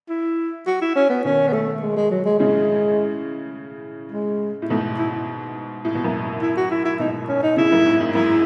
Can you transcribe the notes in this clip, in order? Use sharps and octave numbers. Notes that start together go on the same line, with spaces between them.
E4
F#4
E4
C#4
B3
B2 D#3 C#4
B3
A3
G#3
G#3
F#3
G#3
A2 C#3 G#3
G#3
A2
G#2 B2 A3
E4
A2
B2
F#2 A2
E4
F#4
E4
E4
G#2 B2 D#4
C#4
D#4
A2 C#3 E4
F#2 A2
G#2
G#2
F#2 E4